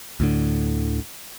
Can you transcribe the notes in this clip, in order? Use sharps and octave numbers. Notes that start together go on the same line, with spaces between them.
D2 A2 D3